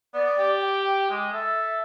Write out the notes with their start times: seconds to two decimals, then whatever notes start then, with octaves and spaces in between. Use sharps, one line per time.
0.14 B3 D5
0.38 G4
0.61 G5
1.10 G#3
1.33 A4 E5